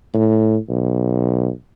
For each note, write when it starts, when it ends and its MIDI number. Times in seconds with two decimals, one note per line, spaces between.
0.14 0.57 45
0.69 1.50 35